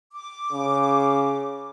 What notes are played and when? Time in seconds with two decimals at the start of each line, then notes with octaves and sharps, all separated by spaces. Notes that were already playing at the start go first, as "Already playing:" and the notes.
0.13 D6
0.52 C#3